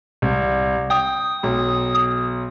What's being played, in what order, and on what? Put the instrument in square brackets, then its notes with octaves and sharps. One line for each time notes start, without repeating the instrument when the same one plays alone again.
[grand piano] C2
[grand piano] G5 [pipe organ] D#6
[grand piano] B1